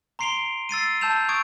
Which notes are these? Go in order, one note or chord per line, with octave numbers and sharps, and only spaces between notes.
A#5 C6 C7 D7 F7 G7
E6 A6 C7 D#7
A5 E6 G6 E7 F7
C#6 D#6 E6 G#6 D7